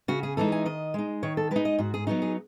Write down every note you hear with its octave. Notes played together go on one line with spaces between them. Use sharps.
C#3 F#4
G#4
E3 G#3 D#4 A4
G#5
D#3 D#5
G#3 D#4
D#3 C#5
A4
G#3 D#4 B4
D#5
G#2 F#4
G#4
F#3 B3 D#4 F#4
G#4